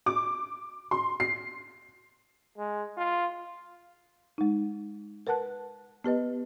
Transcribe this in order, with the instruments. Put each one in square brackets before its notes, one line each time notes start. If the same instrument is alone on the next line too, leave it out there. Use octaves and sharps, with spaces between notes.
[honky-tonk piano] D6
C6
C7
[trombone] G#3
F4
[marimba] G#3 D#4
A#4 B4 F#5 A5 F#6
B3 G4 B4 D#5